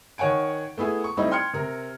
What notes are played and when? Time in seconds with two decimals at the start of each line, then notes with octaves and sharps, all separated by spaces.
0.18 D#3 C#5 F#5 G#5 D7
0.77 A3 B3 E4 G#4
1.04 C#6
1.17 G3 A3 C4 D#4 E4
1.31 G5 C6 F6 G#6 C#7
1.53 C3 A#4